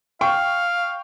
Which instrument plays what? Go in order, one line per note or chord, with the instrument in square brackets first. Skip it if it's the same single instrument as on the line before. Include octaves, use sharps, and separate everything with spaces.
[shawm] F5 [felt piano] G5 C#6